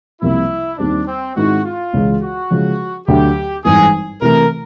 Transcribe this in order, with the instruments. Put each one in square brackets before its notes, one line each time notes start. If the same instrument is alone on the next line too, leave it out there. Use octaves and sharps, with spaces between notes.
[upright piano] C2 C3 F3 A#3 [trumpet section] E4
[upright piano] D#2 D#3 G3 C4 [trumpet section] D4
[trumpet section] C4
[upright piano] G#2 D#3 G#3 C4 E4 [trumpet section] F#4
[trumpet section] F4
[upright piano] C#2 C#3 E3 G#3
[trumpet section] F#4
[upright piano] C#3 F3 G#3
[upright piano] D2 D3 F#3 [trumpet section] G4
[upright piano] G#1 G2 E3 [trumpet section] G#4
[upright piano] C3 E3 A3 [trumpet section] A#4